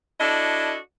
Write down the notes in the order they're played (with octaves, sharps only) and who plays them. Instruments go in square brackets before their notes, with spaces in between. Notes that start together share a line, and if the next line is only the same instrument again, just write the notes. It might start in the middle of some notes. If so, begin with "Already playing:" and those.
[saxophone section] D4 E4 F#4 A4 D5 D#5